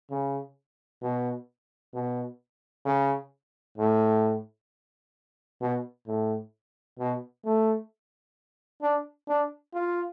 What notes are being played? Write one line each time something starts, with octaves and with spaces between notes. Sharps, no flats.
C#3
B2
B2
C#3
A2
B2
A2
B2
A3
D4
D4
F4